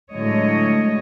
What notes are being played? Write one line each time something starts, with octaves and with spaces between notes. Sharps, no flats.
A2 D3 F#3 G#3 C#5 D#5